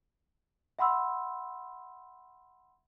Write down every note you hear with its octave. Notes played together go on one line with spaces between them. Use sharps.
E5 F#5 B5 C6 E6